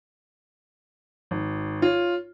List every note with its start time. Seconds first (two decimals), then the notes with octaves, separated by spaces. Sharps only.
1.31 G#1
1.82 F4 C#5